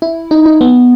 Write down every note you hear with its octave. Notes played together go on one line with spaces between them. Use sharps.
E4
D#4
D#4
B3